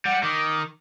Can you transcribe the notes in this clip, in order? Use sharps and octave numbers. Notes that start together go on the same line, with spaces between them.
G3 F#5
D#3 D6